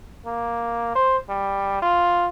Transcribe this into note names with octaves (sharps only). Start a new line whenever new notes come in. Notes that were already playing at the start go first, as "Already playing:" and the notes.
A#3
C5
G3
F4